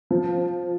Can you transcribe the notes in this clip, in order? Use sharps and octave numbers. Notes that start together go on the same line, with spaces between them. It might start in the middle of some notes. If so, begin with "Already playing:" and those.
F3